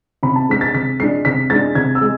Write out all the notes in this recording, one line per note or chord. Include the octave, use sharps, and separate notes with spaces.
C3 B5
A5
G#3 D4 B6
A6
C3 B6
G#3 D4 C7
C3 B6
G#3 D4 A6
C3 G#6
E6
G#3